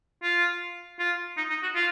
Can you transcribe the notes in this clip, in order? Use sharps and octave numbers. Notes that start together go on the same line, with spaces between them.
F4
F4
D#4
D#4
F#4
F4